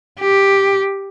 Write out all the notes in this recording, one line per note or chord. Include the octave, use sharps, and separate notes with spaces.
G4